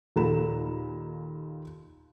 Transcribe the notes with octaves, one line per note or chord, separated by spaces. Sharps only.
D#2 A#2 A4 A#5 B5 E7